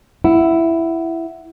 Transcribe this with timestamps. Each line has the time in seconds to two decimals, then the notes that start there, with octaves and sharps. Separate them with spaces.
0.24 E4 F#5